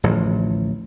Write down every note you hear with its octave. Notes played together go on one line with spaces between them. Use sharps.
D1 A1 D2 F3